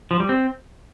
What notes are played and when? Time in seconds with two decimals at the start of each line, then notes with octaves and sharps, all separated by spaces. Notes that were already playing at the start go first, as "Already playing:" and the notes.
0.11 F3
0.20 G3
0.29 C4